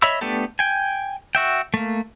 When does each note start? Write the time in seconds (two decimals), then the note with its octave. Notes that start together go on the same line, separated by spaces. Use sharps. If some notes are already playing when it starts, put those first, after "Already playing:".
0.02 C#5 D#5 E5 B5 E6
0.21 A3 B3 D4 G4 A4
0.59 G5 G#5
1.35 F#4 E5 G5
1.74 A3 A#3